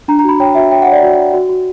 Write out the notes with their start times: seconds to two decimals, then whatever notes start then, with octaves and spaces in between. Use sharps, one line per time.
0.08 D4 A#5
0.19 A#5
0.24 F#4 B5
0.40 C#5 G5
0.55 F#4 E5
0.71 C#5 G5
0.82 F#5
0.87 C#5 D5
1.03 F#4
1.18 F#4
1.33 F#4
1.49 F#4